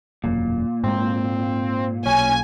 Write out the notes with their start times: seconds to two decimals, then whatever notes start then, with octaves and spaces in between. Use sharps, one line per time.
0.24 E1 F#2 A#2
0.84 G#2 G#3 A#3 C4
2.06 B1 C#4 G#5